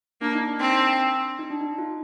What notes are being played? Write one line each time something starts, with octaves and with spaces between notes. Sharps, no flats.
A#3 D4
D#4
D4
C4
D#4
D4
D#4
F4